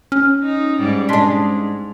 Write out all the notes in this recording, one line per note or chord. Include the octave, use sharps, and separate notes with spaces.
C#4 F6
D#4
G#2 G3
G#2 G#3 D4 A5 C6 B6